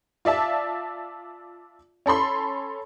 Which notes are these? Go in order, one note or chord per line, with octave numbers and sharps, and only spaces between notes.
F4 D5 E5 A5
C#4 A4 B5 C6